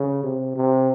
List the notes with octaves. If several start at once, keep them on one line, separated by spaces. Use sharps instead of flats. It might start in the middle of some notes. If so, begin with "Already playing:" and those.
Already playing: C#3
C3
C3